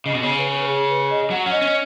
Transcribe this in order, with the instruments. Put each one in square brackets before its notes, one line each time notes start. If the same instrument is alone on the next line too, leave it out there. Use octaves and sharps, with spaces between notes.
[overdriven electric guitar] C#3 [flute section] D#5
[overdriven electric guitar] B2
[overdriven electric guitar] C#3 [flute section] C#5
[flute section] B4
B4
G#4
B4
D#5
[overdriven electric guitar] F#3 [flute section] F#5
[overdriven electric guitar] C#4 [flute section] F#5
[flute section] D#5
[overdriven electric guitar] C#4
[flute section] D#5